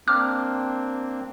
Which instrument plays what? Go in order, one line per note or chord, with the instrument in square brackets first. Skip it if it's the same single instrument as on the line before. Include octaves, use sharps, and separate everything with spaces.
[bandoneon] A#3 C4 D4 [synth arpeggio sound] D6 F6